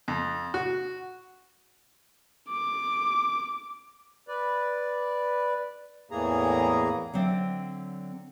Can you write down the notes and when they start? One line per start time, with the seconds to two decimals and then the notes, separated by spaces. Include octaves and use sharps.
0.08 F2
0.54 F#4
2.49 D6
4.28 B4 D5
6.11 E2 A2 E3 A#3 G#4 A#5
7.13 D3 F#3 C4 D5 E5